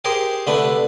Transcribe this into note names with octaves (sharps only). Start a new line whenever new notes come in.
G4 G#4 A#4 C5
C2 D3 A3 B4 B5